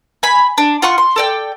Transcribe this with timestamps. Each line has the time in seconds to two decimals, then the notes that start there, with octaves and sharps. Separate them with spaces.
0.23 G#5 B5
0.58 D4
0.82 F4 F#5 C6 C#6
0.98 C6
1.16 A4 D5 G5